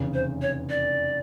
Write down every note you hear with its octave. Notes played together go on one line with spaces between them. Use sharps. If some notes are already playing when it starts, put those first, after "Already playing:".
Already playing: F1 E2 C#3
C5
C#5
D5